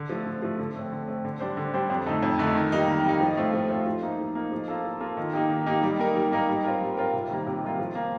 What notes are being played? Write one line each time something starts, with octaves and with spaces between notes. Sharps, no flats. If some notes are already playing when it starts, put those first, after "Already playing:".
Already playing: D3
F3 A3
D3
F3 A3
D3
A3 C4
D3
A3 C4
D3
G3 D4 G4 C5
D3
G3 D4 G4 C5
F2
D3 A3 D#4 A4
F2
D3 A3 D#4 A4
D#3
G3 A#3 D#4
D#3
G3 A#3 D#4
F3
A3 C4 F4
F3
A3 C4 F4
F3
A#3 D#4
F3
A#3 D#4
F3
A#3 F4 A4
F3
A#3 F4 A4
D#3
A#3 D#4 G4
D#3
A#3 D#4 G4
G3
A#3 D#4 A#4
G3
A#3 D#4 A#4
G3
C4 F4 A#4
G3
C4 F4 A#4
C3
D#3 G3 A#3 F4
C3
D#3 G3 A#3 F4
F3
A#3 F4